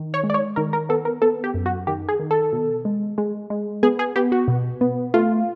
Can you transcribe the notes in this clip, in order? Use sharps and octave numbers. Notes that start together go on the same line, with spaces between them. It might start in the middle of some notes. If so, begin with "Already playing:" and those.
Already playing: D#3
C#5
G#3
D5
C#5
D#3 A#4
A#4
B3 A4
A#4
B3 A4
G4
F#2
F#4
D#3 G4
G#4
D#3
A4
B2
G#3
G#3
G#3
B3 G#4
G#4
B3 G4
F#4
B2
B3
A3 F4